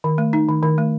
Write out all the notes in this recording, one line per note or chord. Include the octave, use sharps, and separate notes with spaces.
D#3
A3
D#4
D#3
D#3
A3